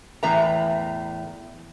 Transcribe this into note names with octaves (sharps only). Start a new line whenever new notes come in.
E2 A2 B4 E5 A#5